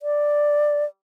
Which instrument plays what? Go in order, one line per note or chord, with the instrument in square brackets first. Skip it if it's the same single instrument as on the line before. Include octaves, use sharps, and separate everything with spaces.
[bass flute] D5